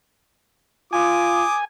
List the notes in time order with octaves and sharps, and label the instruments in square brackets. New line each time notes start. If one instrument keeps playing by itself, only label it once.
[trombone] F4 [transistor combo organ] G#5 [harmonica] D6 D#6